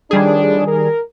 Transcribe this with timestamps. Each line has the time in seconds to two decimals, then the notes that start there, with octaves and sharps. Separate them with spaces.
0.11 A2 D#3 F3 G3 D4 G#4
0.68 A#4